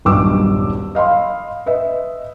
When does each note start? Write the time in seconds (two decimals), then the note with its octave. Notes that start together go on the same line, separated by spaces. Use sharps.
0.05 D#1 B1 G2 D6 E6
0.95 D#5 F5 B5 C6
1.66 B4 D#5 E5